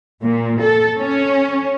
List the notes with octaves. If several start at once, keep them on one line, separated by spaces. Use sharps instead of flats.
A#2
A4
C#4